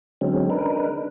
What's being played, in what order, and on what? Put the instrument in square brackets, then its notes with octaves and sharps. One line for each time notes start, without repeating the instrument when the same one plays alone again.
[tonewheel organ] D3 F#3 G#3 C4 C#4
D4 D#4 A#4 B4